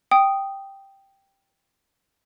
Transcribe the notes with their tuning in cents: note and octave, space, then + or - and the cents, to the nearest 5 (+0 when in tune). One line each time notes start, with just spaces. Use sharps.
G5 +0 D#6 +0